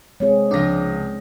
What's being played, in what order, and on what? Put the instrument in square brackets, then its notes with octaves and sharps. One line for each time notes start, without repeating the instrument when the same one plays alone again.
[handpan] G#3 C4 G#4 [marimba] C#5
[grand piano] C#2 A#6 [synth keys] F3 D4